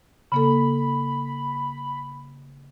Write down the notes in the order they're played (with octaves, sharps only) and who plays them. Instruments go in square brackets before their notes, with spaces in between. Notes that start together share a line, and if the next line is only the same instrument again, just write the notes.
[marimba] C#3 A#3 A4 [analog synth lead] B5